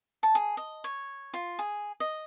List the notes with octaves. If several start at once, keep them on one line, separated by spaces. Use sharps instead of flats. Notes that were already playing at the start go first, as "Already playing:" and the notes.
A5
G#4
D#5
C#5
F4
G#4
D#5